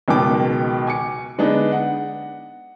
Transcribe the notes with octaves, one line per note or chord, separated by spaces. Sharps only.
C#2 B2 D#3 F#3 G5 D6
G#5 D6 C#7
D3 G#3 B3 D4 D#4
F#5